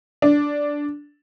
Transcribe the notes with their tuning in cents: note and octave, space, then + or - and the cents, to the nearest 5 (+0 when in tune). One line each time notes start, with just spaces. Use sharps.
D4 -5